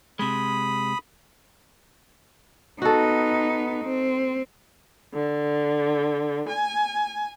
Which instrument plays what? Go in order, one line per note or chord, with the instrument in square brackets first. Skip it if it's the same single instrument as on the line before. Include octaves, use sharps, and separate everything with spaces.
[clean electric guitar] C3 G#3 [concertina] B5 D#6
[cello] B3 D#4 [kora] F#4 A4
[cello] C4
[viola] D3
G#5